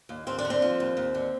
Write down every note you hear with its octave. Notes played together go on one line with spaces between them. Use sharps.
D#2
D#2 C4
D4
D3
C4
F3
D#2
D#2
D3